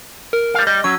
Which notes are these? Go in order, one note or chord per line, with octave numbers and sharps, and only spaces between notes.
A#4
G3 F5
G3 D#5
F#3 C#4 E6